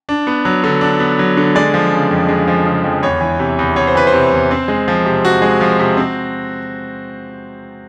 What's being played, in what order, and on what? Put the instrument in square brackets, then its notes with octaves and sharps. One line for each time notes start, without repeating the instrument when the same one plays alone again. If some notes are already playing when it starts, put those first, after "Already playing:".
[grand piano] D4
B3
F#3
D3
D4
B3
F#3
D3
G#3 D5
F3
C#3
F2
G#3
F3
C#3
F2
E2 C#5
E3
C3
E2
E2 C#5
C5
E3 B4
C5
C3
E2
C4
G#3
F3
C3
C4 F#4
G#3
F3
C3
C4